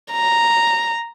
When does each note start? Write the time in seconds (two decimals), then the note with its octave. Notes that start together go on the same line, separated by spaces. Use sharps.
0.12 A#5